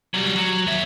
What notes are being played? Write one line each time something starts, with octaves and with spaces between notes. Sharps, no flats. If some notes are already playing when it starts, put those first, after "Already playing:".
F#3 G3
F#3
D#2 E5